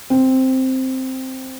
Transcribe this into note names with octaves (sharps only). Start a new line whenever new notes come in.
C4